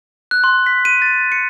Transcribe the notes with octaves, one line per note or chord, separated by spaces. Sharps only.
F#6
C6
B6
D#7
A6
C#7